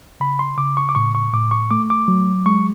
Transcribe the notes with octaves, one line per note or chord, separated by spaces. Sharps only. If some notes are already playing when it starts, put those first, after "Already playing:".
C#3 B5
C6
C#3 D6
C#6
D6
A2 C#6
C#6
A2 D6
C#6
A3 D6
D6
F#3
G#3 C#6